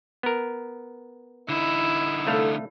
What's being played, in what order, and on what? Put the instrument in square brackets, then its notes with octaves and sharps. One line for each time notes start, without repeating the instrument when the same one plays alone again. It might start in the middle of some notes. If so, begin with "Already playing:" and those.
[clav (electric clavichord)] B3 A#4
[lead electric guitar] D3 D#4 [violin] E4
[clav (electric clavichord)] C2 A3 F5 [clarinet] A4